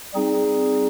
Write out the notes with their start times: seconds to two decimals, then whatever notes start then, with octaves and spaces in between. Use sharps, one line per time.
0.13 G3 C4 D#4 G#4